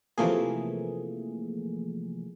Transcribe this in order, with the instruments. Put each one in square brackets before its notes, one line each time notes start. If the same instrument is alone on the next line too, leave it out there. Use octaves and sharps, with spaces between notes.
[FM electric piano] C3 E3 F3 A3 A#3 G#4